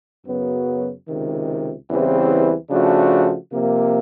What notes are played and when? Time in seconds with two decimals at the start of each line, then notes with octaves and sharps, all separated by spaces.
0.26 F#2 C#3 F#3 B3
1.08 C#2 C3 D#3
1.90 E2 C#3 E3 G3 C4
2.70 C#3 F3 A3 D4 F#4
3.52 C3 F3 A#3